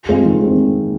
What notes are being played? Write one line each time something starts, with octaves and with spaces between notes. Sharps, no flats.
G#3 C4 F4
D#3
G#3 C4